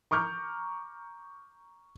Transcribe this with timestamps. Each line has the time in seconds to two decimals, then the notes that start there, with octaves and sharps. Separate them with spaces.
0.11 A#5 C#6 D6 F6 G6